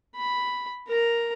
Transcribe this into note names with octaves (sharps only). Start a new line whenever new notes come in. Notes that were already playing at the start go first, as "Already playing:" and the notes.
B5
A#4 A#5